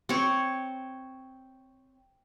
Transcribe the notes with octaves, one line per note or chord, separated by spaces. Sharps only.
C4 C#5